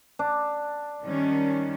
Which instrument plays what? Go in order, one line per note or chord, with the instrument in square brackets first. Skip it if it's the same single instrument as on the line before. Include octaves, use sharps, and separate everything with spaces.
[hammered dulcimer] D4
[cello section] D#3 G3 C#4